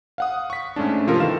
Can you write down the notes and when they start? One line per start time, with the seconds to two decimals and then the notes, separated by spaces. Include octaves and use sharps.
0.18 F5 F#5 D#6
0.50 C#6 B6
0.76 G#2 A3 C#4 D4
1.07 C3 F3 F4 A4 A#4 C5
1.19 D#3 E3 F5 E7